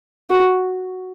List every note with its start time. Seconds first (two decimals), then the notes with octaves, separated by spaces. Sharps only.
0.30 F#4